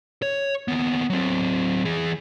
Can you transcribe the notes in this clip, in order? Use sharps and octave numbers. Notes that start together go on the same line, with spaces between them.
C#5
D#2 B3
F#3 C4
E3 G#4